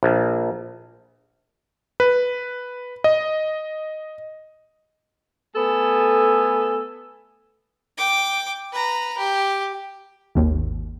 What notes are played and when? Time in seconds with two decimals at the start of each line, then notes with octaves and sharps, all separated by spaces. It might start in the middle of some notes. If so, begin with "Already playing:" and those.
0.03 A#1
2.00 B4
3.04 D#5
5.56 A3 B3 A4 G#5
7.98 G5 D6
8.72 B4 A#5
9.18 G4
10.35 G#1 D#2